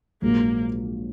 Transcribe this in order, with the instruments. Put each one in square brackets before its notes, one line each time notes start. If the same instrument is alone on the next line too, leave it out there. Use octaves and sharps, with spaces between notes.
[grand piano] A#1 G#2 F#3 [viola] A#3